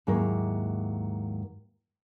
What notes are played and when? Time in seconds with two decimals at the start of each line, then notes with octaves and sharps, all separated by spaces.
0.07 D#2 G#2 F#3 A#3 E4 A#4